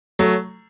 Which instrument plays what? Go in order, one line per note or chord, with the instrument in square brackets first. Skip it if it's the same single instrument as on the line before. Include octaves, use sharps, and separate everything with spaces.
[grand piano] F#3 A3